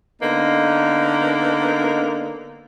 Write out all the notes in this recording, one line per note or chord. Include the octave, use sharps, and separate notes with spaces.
D3 A#3 B3 D#4